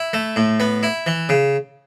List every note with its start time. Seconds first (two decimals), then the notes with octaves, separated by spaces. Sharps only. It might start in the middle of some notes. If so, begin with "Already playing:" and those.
Already playing: E4
0.13 A3
0.36 A2
0.60 B3
0.83 E4
1.06 E3
1.29 C#3